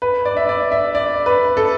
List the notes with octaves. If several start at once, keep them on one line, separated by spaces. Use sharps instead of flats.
B4
D5
E5
D5
E5
D5
B4
A4